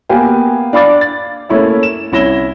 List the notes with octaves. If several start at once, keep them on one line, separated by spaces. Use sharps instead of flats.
A#3 B3 G4 F5 G#5
D4 F5 B5 D6 A6
A6
A3 A#3 C#4 E4 C#5 E5
E7
C2 C#4 E4 A#6 E7 G7